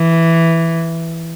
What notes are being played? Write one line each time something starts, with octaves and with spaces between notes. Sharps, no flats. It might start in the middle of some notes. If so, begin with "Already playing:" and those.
Already playing: E3